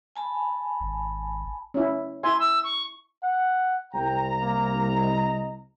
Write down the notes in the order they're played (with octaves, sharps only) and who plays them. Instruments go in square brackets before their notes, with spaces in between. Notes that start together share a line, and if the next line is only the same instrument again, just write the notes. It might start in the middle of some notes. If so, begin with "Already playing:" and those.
[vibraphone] G#5 A5 B5
[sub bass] G#1
[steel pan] C#4 E4
[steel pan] E4 E5 G#5 [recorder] C6
[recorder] E6
C#6
[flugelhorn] F#5
[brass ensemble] C2 A#5 [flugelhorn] G5
[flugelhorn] A#3
D#5